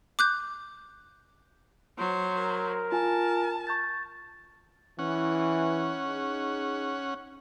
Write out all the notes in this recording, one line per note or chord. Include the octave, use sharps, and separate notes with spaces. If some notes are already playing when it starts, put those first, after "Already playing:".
D6 F#6 G6
F#3 C5
A#4
F4 G#5 A5
C#6 G6 A6
E3 C#4 F#5
D#4 G#4